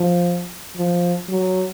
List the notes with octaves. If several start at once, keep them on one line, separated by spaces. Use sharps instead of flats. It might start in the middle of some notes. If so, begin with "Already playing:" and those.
Already playing: F3
F3
F#3